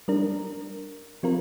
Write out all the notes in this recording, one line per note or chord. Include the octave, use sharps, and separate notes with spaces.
G3 D4 A#4
F3 C4 F4 A#4